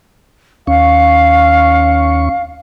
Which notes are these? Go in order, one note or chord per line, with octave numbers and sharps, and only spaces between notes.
D#2 C#4 F5 C#6